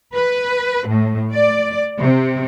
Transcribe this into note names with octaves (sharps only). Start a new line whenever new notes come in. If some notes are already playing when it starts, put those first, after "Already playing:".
B4
A2
D5
C3